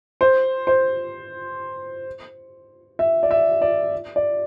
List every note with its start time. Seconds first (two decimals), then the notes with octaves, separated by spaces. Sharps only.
0.21 C5
0.67 C5
2.99 E5
3.23 D5
3.31 E5
3.62 D5
4.16 D5